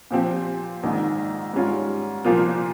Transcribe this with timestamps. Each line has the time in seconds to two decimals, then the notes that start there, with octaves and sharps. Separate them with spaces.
0.11 A#2 F3 C4 G4
0.83 A#1 G#2 D#3
1.54 G#2 G3 C#4 F4
2.25 C2 A#2 F3 A#3 F4